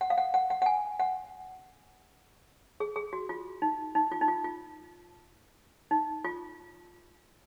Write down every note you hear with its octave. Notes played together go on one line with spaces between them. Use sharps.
F#5
F5
F#5
F#5
F#5
F#5
G#5
F#5
G#4
G#4
F#4
F4
D#4
D#4
F4
D#4
F4
F4
D#4
F4